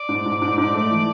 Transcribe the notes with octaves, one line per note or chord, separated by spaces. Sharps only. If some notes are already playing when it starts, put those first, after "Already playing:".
Already playing: D5
G#2
G#2
G#2
G#2
A3
E3